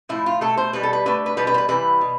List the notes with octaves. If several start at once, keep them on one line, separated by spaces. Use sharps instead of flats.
A2 F3 A3 E4
F4
B2 A3 A4
C5
B2 G3 B4
A4
B4
D3 A3 B4
B4
B2 G3 B4
B4
C5
B4
C3 E3 G3 B4
B2